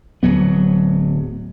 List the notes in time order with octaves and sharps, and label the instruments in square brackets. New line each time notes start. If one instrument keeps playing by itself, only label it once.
[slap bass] D1 F#3 B3